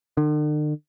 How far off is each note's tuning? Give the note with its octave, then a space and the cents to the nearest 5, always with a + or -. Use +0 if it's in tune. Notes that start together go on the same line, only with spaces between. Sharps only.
D3 +45